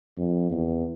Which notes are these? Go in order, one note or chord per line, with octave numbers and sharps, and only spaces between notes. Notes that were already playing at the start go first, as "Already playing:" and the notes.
F2
E2